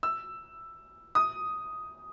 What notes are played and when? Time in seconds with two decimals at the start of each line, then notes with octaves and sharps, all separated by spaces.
0.03 E6
1.15 D#6